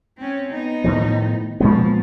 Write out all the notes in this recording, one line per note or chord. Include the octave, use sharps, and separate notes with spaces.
C4 C#4
B3 D#4
A2 D#3 F3
A#2 F3 G#3 B3